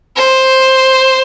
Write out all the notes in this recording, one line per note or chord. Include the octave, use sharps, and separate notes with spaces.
C5